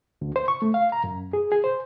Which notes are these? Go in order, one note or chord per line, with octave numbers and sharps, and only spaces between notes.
D2
C5
C#6
A3
F5
A#5
F#2
G#4
G#4
C5